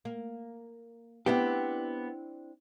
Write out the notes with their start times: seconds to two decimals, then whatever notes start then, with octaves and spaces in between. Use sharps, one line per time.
0.05 A#3
1.26 B3 C4 D4 E4 G4